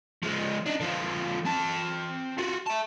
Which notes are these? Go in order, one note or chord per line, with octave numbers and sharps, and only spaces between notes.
F3 G#3
D4 D#4
D3 F3
C4 A5
F4 F#4
E5 A5